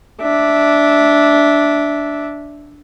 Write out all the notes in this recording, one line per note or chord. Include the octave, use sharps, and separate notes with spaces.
D4 E5